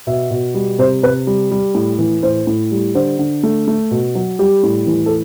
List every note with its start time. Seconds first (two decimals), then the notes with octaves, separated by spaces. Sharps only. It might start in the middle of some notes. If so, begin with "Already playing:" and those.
0.07 B2 E5
0.31 B2
0.54 G3
0.79 C3 C5
1.03 C3 B4
1.27 G3
1.51 G3
1.75 A2
1.99 E3
2.23 A2 C5
2.47 A2
2.72 G3
2.95 D3 C5
3.19 D3
3.43 A3
3.67 A3
3.91 B2
4.15 F#3
4.39 G3 G4
4.63 A2
4.87 E3
5.06 A4